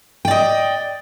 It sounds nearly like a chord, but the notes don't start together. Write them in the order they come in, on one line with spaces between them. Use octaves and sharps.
G5 D5 D#5